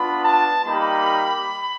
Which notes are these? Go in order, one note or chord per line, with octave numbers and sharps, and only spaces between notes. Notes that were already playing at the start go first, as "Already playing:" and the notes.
Already playing: B3 D4 F4 B5
A5
G3 A#3 D#4 G4 B5